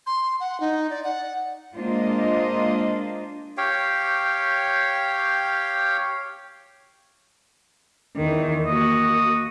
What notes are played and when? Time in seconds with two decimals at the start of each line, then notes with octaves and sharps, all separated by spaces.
0.07 C6
0.40 F#5
0.60 D#4
0.90 D5
1.04 F#5
1.74 G#3 A#3 D4 F4 C5 D#5
3.58 G4 C#5 F5 G5
8.16 E2 D#3
8.66 A#3 F#4 D#5